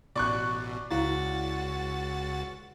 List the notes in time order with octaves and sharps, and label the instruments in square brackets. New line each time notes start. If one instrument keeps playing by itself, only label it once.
[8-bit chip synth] A1 B2 [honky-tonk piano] D5 C#6 F#6
[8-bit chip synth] C#2 F#4 A6 [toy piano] E4 F5 F#5